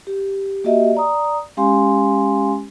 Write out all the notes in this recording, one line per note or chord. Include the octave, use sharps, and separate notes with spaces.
G4
A#3 F#4 G4 D#5 E5
D5 A#5 D#6
G#3 C#4 G4 F5 G#5 C6